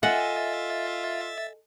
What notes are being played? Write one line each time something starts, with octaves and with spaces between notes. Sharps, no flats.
F4 A4 D#5 E5 F#5 G#5 A6